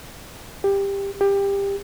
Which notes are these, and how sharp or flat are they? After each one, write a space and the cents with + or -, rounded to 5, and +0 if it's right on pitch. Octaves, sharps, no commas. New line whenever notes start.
G4 +15
G4 +20